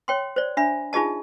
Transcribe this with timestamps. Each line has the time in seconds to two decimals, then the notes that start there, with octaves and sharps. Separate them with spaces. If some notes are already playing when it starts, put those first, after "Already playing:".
0.08 C#5 G5 C6
0.36 C5 D5
0.57 D4 E5 B5
0.93 D#4 F4 G#4 D#5 A5